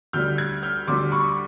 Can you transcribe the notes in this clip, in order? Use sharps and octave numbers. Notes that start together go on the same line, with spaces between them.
D2 D3 G3 F6 G6
F#6 G#6
F6 G6
D2 D3 G3 C6 D6
B5 C#6